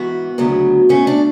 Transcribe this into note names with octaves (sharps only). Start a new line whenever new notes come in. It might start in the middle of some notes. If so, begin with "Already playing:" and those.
Already playing: G#2 E3 B3 F#4
D2 C#3 F#3 B3
B2 A3 C#4
D4